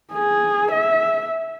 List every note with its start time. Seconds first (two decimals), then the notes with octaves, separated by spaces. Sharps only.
0.13 G#4
0.71 E5